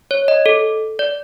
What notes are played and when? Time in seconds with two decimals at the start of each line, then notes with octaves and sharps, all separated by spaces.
0.11 C#5
0.28 D#5
0.46 A4
0.99 D5